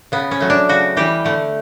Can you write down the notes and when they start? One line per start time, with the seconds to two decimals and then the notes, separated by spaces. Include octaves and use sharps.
0.12 C#3 B3
0.31 C#4
0.40 F#3 A3
0.50 D4
0.69 C#3 F#4
0.97 E3 G3 G4
1.25 D3 A3